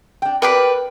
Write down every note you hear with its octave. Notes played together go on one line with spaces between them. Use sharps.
D4 G5
G4 A#4 B4 D5 G5 B5